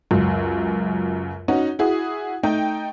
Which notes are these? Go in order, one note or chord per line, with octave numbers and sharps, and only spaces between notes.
C#2 F#2
C#4 D#4 F#4
E4 F#4 G#4
A3 D#4 G5